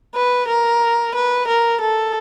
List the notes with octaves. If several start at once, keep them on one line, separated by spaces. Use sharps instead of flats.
B4
A#4
B4
A#4
A4